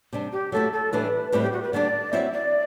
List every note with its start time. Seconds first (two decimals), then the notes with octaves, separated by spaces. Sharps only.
0.13 C3 G3 D4
0.32 G4
0.52 F#3 A3 E4 A4
0.72 A4
0.92 A2 E3 G3 D4 B4
1.32 A2 G3 C4 E4 B4
1.42 G4
1.52 F#4
1.63 B4
1.73 D3 G3 B3 D4 D5
2.13 F#3 C4 E4 E5
2.33 D5